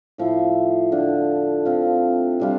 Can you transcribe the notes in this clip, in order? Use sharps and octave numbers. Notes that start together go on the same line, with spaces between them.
A2 F3 A3 E4
D3 A3 D4 F4
F3 C4 F4
C3 G3 D4 F4